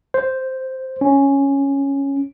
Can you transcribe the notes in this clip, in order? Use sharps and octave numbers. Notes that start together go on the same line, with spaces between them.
C5
C#4